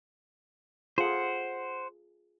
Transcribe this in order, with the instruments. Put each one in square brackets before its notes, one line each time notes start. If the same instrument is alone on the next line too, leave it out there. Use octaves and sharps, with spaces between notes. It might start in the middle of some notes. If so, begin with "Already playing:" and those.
[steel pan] F4 G#4 A4 [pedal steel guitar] C5 F#5